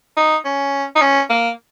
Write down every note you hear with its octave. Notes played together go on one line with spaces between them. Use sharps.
D#4
C#4
D#4
C#4
A#3